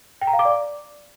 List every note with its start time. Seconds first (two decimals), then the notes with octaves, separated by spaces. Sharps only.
0.21 G5
0.27 A#5
0.33 F5
0.39 D6
0.45 D5